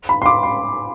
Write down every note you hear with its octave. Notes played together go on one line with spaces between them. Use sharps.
B5
C6
D6
C6